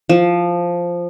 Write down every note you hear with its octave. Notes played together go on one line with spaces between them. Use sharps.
F3